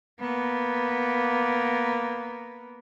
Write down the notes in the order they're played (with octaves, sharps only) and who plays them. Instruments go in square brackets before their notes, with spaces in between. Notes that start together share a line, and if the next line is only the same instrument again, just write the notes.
[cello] A#3 B3